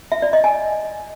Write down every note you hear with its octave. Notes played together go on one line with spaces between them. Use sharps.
E5
D5
D#5
G#5